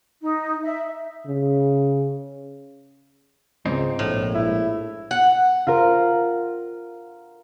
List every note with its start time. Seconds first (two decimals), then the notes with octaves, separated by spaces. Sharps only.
0.22 D#4
0.63 E5
1.26 C#3
3.66 C#2 G#2 C4 D#4
3.99 A#1 A2
4.35 E4
5.11 F#5
5.67 F4 A#4